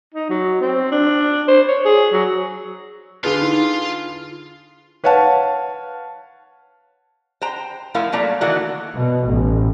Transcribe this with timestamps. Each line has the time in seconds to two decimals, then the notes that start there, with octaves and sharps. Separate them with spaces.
0.14 D#4
0.30 F#3
0.61 C4
0.92 D4
1.48 C5
1.68 C#5
1.85 G#4
2.13 F#3
3.24 D3 F4 G#4 B4 F5
3.41 D#4 E4
5.04 B4 C#5 F5 F#5 A5
7.42 C5 G5 A#5
7.94 F3 A3 E4 A#4 F5
8.12 F#3 A3 A#3 D5 A#5
8.41 D#3 E3 A3 E4 F#4 A#4
8.95 B2
9.28 A1